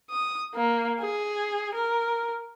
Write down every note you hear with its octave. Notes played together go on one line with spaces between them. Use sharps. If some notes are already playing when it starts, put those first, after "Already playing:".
D#6
A#3
G#4
A#4